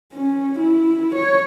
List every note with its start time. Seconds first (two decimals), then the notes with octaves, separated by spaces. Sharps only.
0.13 C#4
0.59 E4
1.15 C#5